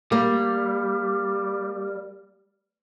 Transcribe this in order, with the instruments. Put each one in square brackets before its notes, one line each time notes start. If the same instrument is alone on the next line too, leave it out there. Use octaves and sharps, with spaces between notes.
[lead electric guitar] G3 [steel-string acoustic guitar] A#3